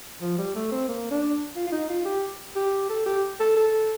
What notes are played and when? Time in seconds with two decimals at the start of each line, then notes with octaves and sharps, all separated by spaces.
0.21 F3
0.38 G3
0.55 A3
0.71 C4
0.88 A#3
1.11 D4
1.55 F4
1.67 F4
1.72 D#4
1.89 F4
2.05 G4
2.56 G4
2.89 A4
3.06 G4
3.40 A4
3.56 A4